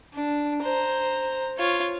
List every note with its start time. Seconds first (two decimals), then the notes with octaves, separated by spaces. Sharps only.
0.15 D4
0.62 C5 A#5
1.58 F4 C#5